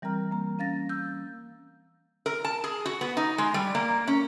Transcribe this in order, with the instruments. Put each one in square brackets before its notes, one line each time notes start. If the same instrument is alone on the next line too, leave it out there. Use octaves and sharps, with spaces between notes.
[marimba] E3 G3 C4 A#4 A#5 F6
A#3 A#5
C#4 F5 A6 A#6
E6 G6
[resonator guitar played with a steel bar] A#4
A5
G#4
F#4
B3
D#4
G#3
G3
A#3
C#4